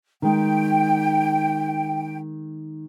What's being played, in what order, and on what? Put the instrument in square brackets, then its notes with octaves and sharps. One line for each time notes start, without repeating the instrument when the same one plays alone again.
[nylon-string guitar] D#3 G#3 [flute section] G5